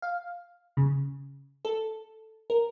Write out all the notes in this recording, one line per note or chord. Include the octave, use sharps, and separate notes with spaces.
F5
C#3
A4
A#4